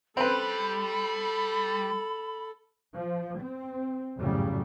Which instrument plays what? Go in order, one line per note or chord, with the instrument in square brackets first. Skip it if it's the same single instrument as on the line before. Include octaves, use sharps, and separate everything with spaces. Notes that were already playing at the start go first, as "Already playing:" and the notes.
[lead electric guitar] G3 [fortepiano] C4 B4 [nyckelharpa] A4 [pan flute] B5
[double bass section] F3
C4
G#1 F2 A2 C#3 F#3 G3